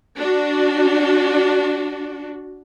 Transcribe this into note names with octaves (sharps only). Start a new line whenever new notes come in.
D4 F#4